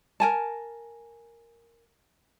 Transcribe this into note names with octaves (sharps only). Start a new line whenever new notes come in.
A#4 G#5 A5